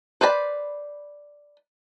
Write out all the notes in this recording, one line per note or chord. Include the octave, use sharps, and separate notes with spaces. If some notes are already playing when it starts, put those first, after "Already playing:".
B4 C5 D5 A5 B5